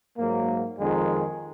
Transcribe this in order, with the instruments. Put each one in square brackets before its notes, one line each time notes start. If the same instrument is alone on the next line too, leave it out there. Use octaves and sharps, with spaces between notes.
[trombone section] G#2 F#3 A#3
F2 D#3 G#3